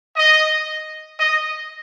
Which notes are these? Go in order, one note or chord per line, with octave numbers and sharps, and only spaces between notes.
D#5
D#5